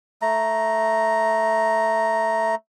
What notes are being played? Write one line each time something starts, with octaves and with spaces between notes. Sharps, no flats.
A3 A#5